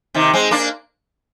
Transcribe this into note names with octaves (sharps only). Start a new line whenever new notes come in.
C3 D#3
G#3 C4
A#3 D4